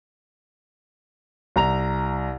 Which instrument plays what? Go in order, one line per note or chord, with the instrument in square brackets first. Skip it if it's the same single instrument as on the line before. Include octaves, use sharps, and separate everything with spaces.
[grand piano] C2 A#5 F7